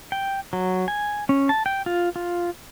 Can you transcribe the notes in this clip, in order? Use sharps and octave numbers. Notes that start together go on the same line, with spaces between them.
G5
F#3
G#5
C#4
A5
G5
F4
F4